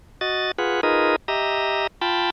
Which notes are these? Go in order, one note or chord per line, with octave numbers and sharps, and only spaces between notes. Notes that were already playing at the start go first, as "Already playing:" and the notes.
F#4 D#5 A6
F4 G#4 B4 F#5
D#4 F4 G#4 A#4 B4 D#5
G4 D#5 E5 A#5
F4 G5 A5 B5